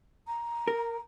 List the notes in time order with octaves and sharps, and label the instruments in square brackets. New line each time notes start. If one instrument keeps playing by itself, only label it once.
[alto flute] A#5
[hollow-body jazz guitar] A#4